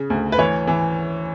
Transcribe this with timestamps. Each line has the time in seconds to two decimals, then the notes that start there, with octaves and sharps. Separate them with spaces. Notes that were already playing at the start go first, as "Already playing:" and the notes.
Already playing: C#3
0.10 D2
0.32 B4
0.38 E3 C#5
0.67 E3